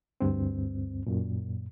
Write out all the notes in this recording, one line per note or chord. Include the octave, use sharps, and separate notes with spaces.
D2 G2 C4
F#2 A#2